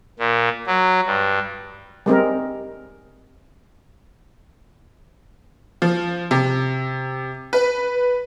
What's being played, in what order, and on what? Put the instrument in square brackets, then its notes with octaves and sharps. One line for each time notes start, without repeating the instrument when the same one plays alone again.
[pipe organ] A#2
F#3
G2
[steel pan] G3 G#3 C4 A#4
[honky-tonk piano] F3
C3
B4